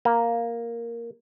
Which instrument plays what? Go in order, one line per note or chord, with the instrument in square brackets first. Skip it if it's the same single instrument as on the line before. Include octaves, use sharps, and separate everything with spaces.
[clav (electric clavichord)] A#3